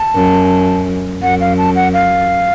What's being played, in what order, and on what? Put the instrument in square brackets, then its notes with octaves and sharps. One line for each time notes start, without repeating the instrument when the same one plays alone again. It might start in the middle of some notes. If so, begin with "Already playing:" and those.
Already playing: [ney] A5
[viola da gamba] F#2
[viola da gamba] F#2 [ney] F#5
[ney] F5
A5
F#5
F5